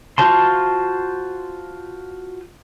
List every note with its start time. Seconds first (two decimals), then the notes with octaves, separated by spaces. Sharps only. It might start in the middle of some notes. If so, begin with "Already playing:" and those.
0.18 F4 F#4 C5 A5 C6